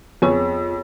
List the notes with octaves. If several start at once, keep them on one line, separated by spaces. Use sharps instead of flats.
F2 B3 G#4 C#5